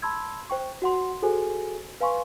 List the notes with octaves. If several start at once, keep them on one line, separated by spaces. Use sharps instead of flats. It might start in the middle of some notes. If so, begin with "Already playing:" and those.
A5 B5 C6 E6 G#6
C5 G5 C#6
F#4 F#5 C6
F#4 G#4 A4 C5 G#5
B4 F5 G#5 C6 C#6